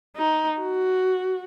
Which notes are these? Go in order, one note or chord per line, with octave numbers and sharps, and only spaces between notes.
D#4
F#4